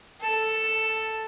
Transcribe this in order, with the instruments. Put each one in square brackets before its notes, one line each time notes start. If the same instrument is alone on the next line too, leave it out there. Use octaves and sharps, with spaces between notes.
[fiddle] A4